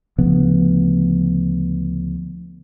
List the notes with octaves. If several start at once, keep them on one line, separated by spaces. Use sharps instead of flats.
D2 C#3 F3 B3